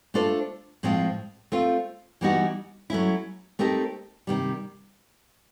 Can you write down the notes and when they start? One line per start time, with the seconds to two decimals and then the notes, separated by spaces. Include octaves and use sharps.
0.14 A3 D4 F4 A4 C5
0.83 A2 F3 G#3 C4 F4
1.52 A3 C4 F4
2.21 E3 G3 B3 D#4 F#4
2.90 F#3 A3 C#4 E4
3.59 A3 C4 D#4 G4 A#4
4.27 C3 D#3 G3